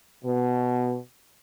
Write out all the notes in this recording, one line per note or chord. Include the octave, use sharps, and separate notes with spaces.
B2